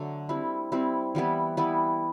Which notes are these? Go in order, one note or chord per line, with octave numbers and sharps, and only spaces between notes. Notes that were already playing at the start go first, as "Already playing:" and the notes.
Already playing: D3 F#3 A3 D4
G3 C4 E4
G3 C4 E4
E3 G3 B3 E4
E3 G3 B3 E4